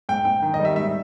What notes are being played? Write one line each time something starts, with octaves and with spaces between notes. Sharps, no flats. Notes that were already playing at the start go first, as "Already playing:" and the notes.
G#2 G5
G#2 G5
D#3
D#5
G3
E5
G#2 E5